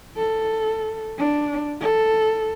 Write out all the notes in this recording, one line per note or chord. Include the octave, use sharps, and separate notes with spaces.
A4
D4
A4